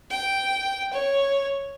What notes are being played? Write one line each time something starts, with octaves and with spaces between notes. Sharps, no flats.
G5
C#5